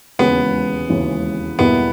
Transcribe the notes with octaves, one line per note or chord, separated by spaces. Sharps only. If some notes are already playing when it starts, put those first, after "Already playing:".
E1 D#2 C#3 E3 G#3 B3
E1 D#2 C#3 E3 G#3
E2 B2 G3 A#3 B3 E4